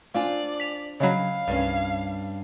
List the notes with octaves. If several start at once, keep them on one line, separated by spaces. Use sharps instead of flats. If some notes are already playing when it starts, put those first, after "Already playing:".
C4 D4 F4 D5 F5 G#5
B6 F7
C#3 F#3 C#5 D#5 F5 B5
C2 G2 C#4